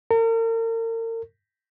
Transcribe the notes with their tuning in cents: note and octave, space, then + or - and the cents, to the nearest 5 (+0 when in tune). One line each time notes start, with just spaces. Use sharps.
A#4 -40